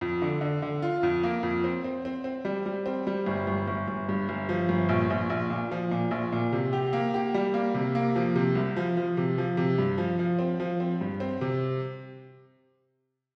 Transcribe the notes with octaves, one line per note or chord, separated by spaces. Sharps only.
F2
D3
D3
D3
F4
F2
A#3
F2
C4
C4
C4
C4
G3
G3
C4
G3
G1
G1
G1
G1
G2
G1
F3
G1
A#1
A#1
A#1
A#2
F3
A#2
A#1
A#2
C3
G4
A#3
G4
G3
A#3
C3
A#3
F3
C3
C2
F3
F3
C3
F3
C3
G2
F3
F3
C4
F3
C4
G2
C4
C3